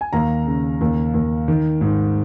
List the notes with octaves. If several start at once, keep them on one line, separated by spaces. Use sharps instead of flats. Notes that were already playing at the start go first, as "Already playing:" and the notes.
G#5
D#2 F5 A#5
C#3
D#2
D#2
D#3
G#2